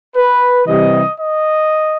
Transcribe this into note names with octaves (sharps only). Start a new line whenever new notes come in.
B4
C3 E3 G3 D#5
D#5